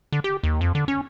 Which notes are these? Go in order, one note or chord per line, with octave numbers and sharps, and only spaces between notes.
D3
G4
D#2
F2
D3
C#4